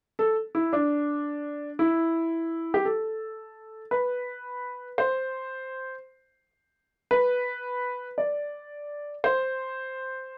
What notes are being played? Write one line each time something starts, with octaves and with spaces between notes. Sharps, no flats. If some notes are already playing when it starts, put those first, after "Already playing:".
A4
E4
D4
E4
G4
A4
B4
C5
B4
D5
C5